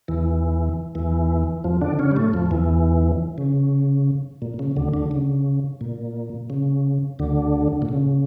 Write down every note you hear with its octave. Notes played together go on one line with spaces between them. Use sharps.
E2 E3
E2 E3
F2 F3
D3 D4
C#3 C#4
G3
A2 A3
F2 F3
E2 E3
C#3
A#2
C#3
D2 D3
D2 D3
C#3
A#2
C#3
D2 D3
A#2
C#3